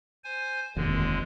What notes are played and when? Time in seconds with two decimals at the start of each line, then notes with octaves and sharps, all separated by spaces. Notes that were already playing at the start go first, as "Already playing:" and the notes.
0.24 C5 G#5
0.77 F1 D#2 D3 G#3